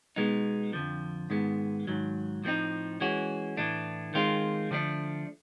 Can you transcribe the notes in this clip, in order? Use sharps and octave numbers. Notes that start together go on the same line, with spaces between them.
B2 G#3 B3 D#4
F2 D3 F3
G#2 D#3 G#3 B3
G#2 D#3 F#3
A2 F3 A3 C4 D#4
E3 G#3 C#4 F#4
A2 E3 A3 D4
D#3 G#3 C4 F4
D3 F3 A3 D4